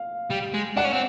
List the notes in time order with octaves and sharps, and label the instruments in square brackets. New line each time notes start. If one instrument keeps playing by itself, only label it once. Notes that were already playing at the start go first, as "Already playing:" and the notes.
Already playing: [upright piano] F5
[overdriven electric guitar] G3
G#3
[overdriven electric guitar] D4 [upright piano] F#5
[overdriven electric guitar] C#4
C4